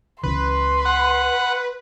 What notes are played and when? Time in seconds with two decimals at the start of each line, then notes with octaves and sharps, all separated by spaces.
0.23 C#2 C#3 E3 B4 C6
0.85 F#5